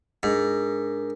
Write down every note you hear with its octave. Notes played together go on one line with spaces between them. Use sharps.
G#2 D4 A#4